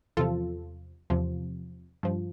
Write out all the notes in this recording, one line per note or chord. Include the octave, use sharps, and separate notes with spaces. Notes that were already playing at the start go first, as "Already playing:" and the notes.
E2 C3 F3 F4 A4
E2 C3 F3
G2 F3